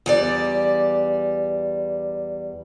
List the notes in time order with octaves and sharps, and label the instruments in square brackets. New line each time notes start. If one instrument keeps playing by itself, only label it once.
[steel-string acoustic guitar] E2 G3 D5